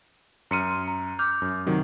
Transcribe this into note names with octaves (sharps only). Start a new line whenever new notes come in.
F#2 A#5 C6 F6 C#7 D#7
A#5
D6 F6 G6
F#2
C3 D#3 F#3